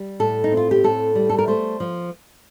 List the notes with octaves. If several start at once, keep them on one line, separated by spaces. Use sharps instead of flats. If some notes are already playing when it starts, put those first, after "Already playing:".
Already playing: G3
A2 A4
D#4
C4
F4
G4
A2 A4
G3
A4
A#4
A3 C5
F3